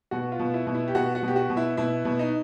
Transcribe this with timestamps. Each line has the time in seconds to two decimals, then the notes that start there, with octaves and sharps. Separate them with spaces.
0.11 B2 F#4
0.32 F4
0.39 B2
0.54 E4
0.67 B2
0.75 E4
0.88 G4
0.95 B2 F#4
1.15 F#4
1.23 B2
1.28 G4
1.36 F#4
1.50 B2
1.57 E4
1.77 B2 E4
2.05 B2
2.19 D#4